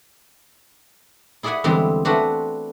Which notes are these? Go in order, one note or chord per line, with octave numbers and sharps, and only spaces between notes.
E4 G#4 D5 E5 F#5 G#5
E2 D3 G3 G#3 C4
A3 C4 D4 F#4 B4 F5